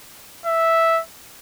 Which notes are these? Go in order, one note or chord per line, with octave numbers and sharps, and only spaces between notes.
E5